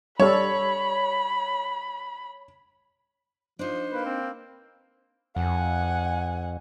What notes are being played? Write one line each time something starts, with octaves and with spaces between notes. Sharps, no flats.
G3 A4 C#5 B5
F3 D4 D#4 C5
A#3 B4
C4
F2 F#5 G#5